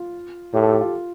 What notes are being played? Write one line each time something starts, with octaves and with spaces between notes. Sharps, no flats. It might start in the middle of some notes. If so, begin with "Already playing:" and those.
Already playing: F4
A2 G4
A4
G4
F4